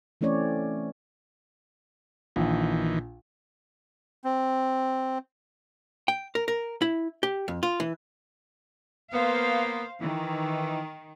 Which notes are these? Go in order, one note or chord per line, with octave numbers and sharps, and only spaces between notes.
E3 A3 C4 C#4 C#5 D5
A#1 D#3 E3
C4
G5
A#4
A#4
E4
G4
F2
F4
E3
A#3 B3 C5 F5
D#3 E3